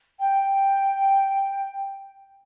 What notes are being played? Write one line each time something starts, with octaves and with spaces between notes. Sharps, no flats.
G5